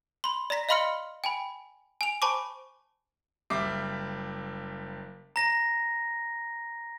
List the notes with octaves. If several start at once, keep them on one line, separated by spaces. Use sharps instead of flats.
B5 C6
D5 A#5 A#6 B6
D#5 F5 B5 C6 F6 C#7
G5 G#5 B5
G#5 F7
C5 G#5 A5 B5 C#6 D6
F#1 G3 E5 D6 B6 C7
A#5 A#6